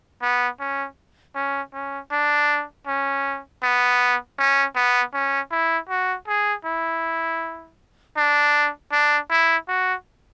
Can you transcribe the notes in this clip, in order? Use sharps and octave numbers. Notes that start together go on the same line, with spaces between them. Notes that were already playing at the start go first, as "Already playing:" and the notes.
B3
C#4
C#4
C#4
D4
C#4
B3
C#4
B3
C#4
E4
F#4
G#4
E4
D4
D4
E4
F#4